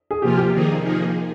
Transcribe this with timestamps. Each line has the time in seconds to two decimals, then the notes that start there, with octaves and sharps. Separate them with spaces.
0.11 G#4
0.22 C3 F3 A#3 F4 G4
0.37 G4
0.53 C3 D#3 A#3 D#4 G#4
0.84 F3 A#3 D#4 G#4